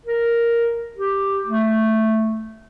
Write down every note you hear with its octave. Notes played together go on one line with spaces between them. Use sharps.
A#4
G4
A3